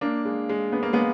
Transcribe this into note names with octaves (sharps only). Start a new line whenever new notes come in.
A#3 D4
G#3
G#3
B3
A#3
G#3 B3